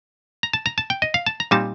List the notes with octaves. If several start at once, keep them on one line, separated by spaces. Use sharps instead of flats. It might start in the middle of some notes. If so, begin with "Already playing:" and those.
A#5
A5
A#5
A5
G5
D#5
F5
A5
A#5
A#2 G3 C4 D#4 A5